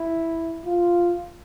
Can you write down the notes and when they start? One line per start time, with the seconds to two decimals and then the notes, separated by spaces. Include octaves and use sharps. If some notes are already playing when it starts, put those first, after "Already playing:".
Already playing: E4
0.65 F4